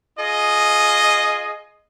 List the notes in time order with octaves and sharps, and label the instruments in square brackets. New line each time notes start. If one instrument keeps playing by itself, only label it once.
[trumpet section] F4 G#4 D#5